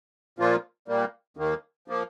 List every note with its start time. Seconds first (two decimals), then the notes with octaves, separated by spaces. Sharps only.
0.39 A#2 F3 A#3 F4
0.88 A#2 G3 A#3
1.37 D#2 D#3 A#3
1.88 F3 A#3